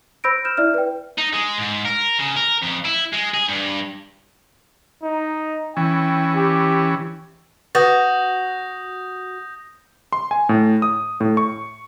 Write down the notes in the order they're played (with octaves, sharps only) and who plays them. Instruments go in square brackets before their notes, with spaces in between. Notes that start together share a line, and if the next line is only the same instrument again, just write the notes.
[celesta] C5 B5 E6 G6 A#6 D7
F6 G6 E7
E4 D5 E5 F6
B4 G5
[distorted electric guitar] D#4
G#3
G#2
A#4
C#3
A#4
F2
E4
G#3
G#4
G2
[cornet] D#4
[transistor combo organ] E3 C#4 [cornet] G5
[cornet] G4
[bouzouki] F#4 [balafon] B4 [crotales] D#6 G6 A#6
[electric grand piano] C6
G#5
A2
D#6
A2
C#6